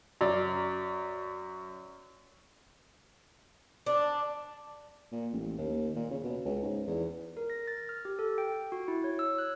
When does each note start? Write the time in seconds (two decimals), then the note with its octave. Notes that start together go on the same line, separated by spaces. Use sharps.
0.21 F#2 D5
3.86 D4
5.12 A#2
5.33 A1
5.58 D#2
5.96 A#2
6.11 C#3
6.23 B2
6.45 C#2
6.62 G#2
6.87 E2
7.37 A#4
7.50 A#6
7.68 A6
7.89 F6
8.05 G4
8.19 A4
8.38 G5
8.72 F#4
8.88 E4
9.04 C#5
9.19 E6
9.38 F#6